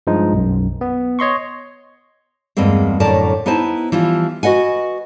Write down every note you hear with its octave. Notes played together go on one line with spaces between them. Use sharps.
G2 F3 G#3 D#4
B1 F#2
B3
C#5 D#5 C6 C#6
E2 G2 G#3 A#3 C4
F#2 A2 D3 A#4 D5 A5
B3 D#4 E4 C5 A5
E3 F3 G3 F4
F#4 B4 D#5 F#5 G#5